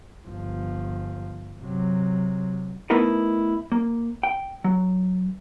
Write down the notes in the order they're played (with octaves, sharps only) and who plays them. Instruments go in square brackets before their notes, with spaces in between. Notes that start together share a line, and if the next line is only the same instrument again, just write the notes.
[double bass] G1 F3
C3 F#3
[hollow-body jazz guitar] A3 B3 D#4 E4 A#4 B4
A#3
G5
F#3